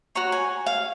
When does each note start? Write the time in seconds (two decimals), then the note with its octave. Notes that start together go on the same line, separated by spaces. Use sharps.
0.15 F#4 C#5 A#5
0.32 G#5
0.66 F5